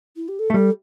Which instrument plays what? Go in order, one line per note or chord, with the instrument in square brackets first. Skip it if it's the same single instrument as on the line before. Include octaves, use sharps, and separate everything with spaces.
[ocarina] E4
G4
A4
[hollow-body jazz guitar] A3
[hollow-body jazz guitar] G3 [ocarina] A4